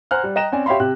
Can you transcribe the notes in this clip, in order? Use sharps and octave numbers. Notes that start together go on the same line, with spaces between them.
C5 F#5 G#5 A#5 F6 F#6
G3
D#5 G5 A#5 F#6 A#6 E7
C4 C#4 D5 G#5
G4 C#5 E5 F5 B5 C6
C3 G4 F#6